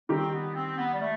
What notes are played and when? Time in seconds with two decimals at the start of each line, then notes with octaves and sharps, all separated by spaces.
0.09 D#3 G3 C4 D#4 G4
0.33 B3
0.54 C4
0.77 B3
0.92 G3
1.00 A3